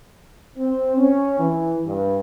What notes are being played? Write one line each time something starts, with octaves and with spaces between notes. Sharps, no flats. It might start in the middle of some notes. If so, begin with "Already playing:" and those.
C4
C#4
E3
G2